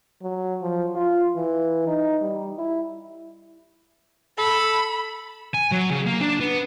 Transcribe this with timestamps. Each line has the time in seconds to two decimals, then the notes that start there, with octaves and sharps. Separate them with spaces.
0.22 F#3
0.62 F3
0.95 F4
1.36 E3
1.87 D#4
2.21 G3
2.58 E4
4.39 A4 B5
5.54 G#5
5.72 F#3
5.91 C#3
6.07 A#3
6.21 D4
6.41 B3